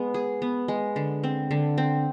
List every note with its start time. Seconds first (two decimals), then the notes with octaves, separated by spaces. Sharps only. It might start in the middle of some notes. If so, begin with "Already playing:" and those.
Already playing: G#3 B3
0.14 G#4
0.42 B3
0.68 G#3
0.96 D3
1.24 C4
1.51 D3
1.78 C4